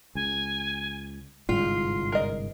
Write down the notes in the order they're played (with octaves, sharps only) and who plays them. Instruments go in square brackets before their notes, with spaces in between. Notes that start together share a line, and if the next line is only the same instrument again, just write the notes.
[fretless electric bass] C#2 [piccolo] G#5
[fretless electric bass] G1 C2 G#2 [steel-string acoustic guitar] F4 [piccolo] C7
[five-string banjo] A#4 D#5